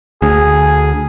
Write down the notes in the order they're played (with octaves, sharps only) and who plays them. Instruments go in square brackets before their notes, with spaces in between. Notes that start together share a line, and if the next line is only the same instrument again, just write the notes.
[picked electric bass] D2 [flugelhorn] G#4